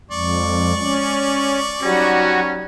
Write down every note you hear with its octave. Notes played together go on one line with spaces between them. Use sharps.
F2 G#3 D5 C#6
C#4
F#3 G3 C#4 D#4 F#4